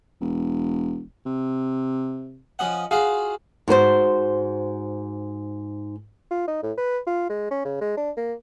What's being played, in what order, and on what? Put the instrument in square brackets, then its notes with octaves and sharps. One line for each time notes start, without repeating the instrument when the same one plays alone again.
[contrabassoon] E1
C3
[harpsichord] F3 C#4 D#5 F#5
F4 F#4 G#4 F5
[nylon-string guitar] G#2 F#4 B4 C5
[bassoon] F4
D#4
A2
B4
F4
G#3
C#4
C#3
G#3
D4
A#3